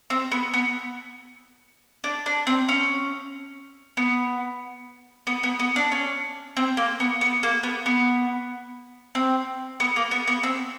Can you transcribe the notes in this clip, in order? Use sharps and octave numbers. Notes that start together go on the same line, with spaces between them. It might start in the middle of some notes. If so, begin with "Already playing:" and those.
C4
B3
B3
D4
D4
C4
C#4
B3
B3
B3
B3
D4
C#4
C4
A#3
B3
B3
A#3
B3
B3
C4
B3
A#3
B3
B3
C4